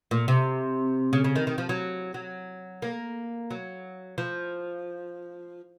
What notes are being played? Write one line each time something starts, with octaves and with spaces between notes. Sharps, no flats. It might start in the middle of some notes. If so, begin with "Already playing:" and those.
A#2
C3
C#3
C#3
D#3
D#3
F3
F#3
F#3
A#3
F#3
F3